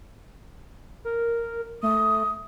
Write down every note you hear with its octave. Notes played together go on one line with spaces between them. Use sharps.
A#4
A3 D#6